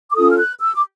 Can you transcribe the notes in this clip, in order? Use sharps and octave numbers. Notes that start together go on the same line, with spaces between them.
D6
C#4 F4 A4 D#6
F6
F#6
E6
D6